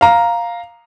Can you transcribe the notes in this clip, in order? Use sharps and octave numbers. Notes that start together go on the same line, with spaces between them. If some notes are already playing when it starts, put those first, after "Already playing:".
F5 A#5